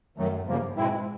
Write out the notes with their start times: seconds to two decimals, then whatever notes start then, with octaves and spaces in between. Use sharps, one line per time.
0.17 F#2 D#3 F#3 A3
0.47 E2 G2 C#3 F3 A#3
0.76 G#2 B2 G#3 C4 E4